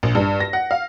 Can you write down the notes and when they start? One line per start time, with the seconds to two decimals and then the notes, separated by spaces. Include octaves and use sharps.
0.03 A#1
0.15 G2
0.40 A#6
0.53 F#5
0.71 F5